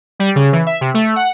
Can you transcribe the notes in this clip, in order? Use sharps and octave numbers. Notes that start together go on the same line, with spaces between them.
G3
C#3
E3
E5
C3
A3
F#5